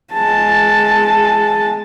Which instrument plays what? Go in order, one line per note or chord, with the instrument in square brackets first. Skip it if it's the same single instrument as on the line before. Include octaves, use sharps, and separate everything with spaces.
[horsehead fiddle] G#3 A5